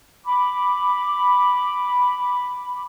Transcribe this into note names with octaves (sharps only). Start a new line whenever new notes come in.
B5 D6